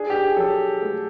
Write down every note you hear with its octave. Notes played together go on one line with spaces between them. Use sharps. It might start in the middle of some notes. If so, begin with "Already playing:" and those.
Already playing: D4 G#4
G4
G#4
F#3 A4
A3